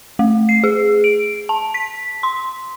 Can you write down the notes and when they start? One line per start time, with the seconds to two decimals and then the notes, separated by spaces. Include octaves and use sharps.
0.19 A3
0.49 C7
0.64 G#4
1.04 D7
1.49 A5
1.74 B6
2.23 C6